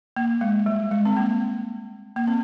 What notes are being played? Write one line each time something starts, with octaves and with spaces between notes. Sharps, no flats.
A#3
G#3
G3
G#3
C4
A#3
A#3
C4